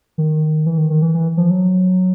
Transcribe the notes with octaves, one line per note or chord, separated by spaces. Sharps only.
D#3
E3
D#3
D#3
E3
E3
F3
F#3